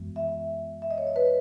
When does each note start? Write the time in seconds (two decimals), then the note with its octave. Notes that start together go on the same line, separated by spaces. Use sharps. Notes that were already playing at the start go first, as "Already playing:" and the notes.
Already playing: F#2 E3 G#3 B3
0.16 E5
0.82 E5
0.91 D#5
0.98 C#5
1.07 D#5
1.16 B4